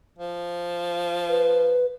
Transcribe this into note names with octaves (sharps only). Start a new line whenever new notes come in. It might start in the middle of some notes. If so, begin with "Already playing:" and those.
F3
B4